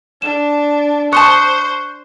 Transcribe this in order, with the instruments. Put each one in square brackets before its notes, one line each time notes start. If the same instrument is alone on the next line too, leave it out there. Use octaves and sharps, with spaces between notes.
[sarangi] D4 [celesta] E7
[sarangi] C5 [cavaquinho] A5 C6 D#6 [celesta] C#6 F#6 C#7